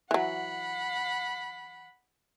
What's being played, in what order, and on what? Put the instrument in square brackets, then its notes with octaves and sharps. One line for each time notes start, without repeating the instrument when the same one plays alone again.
[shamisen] E3 F#3 [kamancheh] F#5 B5